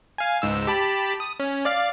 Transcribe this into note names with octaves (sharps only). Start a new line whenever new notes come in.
F5 G#5
C#2 G#2 E6
G4 A5 B5
D#6
C#4
D5 F5